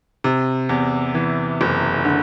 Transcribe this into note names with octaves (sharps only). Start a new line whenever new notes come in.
C3
E2
E3
F#1
D3